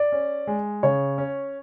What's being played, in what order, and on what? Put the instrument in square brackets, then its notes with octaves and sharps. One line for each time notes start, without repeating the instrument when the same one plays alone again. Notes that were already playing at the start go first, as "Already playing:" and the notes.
Already playing: [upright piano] D5
[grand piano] C#4
G#3
[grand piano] C#3 [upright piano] C#5
[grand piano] C#4